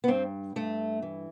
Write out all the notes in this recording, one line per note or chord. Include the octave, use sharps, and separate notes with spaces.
B3
G2 C4
G2 A3
E3